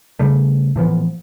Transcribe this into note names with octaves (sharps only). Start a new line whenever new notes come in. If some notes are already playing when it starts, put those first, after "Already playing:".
C#3 G3 A3
A2 E3 F3 B3